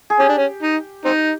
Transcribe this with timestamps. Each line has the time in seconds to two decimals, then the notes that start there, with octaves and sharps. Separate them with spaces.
0.10 G#4
0.20 C#4 G4
0.29 D4
0.38 C#4
0.63 D#4
1.05 C4 D#4